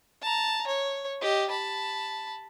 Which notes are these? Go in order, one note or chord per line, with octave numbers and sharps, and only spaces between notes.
A5 A#5
C#5
G4 D#5
A5 B5